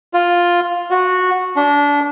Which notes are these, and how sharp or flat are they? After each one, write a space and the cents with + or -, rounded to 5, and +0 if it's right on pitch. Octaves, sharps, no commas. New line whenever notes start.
F4 +5
F#4 -10
D4 -25